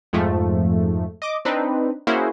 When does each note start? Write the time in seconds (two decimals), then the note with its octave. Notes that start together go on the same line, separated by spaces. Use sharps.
0.13 F2 G#2 F3 A3
1.22 D#5 D6
1.45 C4 D4 D#4 B4
2.07 A#3 C#4 E4 F#4 G#4 C5